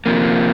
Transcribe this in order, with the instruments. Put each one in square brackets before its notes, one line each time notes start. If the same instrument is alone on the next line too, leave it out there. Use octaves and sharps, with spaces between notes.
[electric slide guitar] C3 F3 A#3